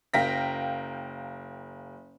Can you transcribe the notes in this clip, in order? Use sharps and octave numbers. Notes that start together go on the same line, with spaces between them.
F#1 A#4 F5 G5 A#6 B6